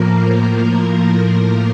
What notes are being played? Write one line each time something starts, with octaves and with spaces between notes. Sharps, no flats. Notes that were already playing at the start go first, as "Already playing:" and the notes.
Already playing: A2 F3 A#3 A#4